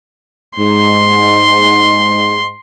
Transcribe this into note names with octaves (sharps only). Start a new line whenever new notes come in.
G#2 C6